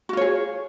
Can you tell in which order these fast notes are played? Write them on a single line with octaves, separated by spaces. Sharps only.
F#4 F4 C#5 G#4